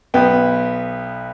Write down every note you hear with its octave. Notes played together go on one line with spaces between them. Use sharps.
B1 B3 G5